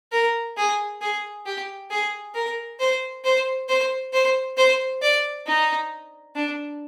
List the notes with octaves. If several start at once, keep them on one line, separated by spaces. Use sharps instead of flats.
A#4
G#4
G#4
G4
G#4
A#4
C5
C5
C5
C5
C5
D5
D#4
D4